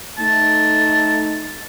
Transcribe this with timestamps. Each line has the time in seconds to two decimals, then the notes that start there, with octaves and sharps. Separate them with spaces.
0.19 A3 D#4 A5